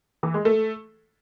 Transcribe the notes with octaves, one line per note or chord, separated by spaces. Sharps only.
E3
G#3
A3